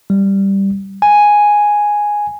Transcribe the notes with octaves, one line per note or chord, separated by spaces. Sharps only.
G3
G#5